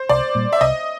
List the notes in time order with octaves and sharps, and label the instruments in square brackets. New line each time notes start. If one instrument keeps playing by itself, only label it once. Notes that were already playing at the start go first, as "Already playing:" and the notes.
Already playing: [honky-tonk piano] C5
[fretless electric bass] C2 [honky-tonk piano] D5
[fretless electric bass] A#2 G3
[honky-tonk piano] E5
[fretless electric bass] C2 [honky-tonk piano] D#5